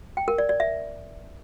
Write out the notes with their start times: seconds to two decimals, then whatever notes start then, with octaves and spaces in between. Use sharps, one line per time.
0.17 G5
0.28 A#4
0.38 D5
0.49 D5
0.60 E5